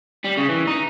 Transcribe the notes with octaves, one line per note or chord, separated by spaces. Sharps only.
G3
C#3
E3
D#4